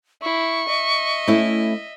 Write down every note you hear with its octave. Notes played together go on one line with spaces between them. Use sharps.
E4 C#6
D#5 E5
A3 C#4 E4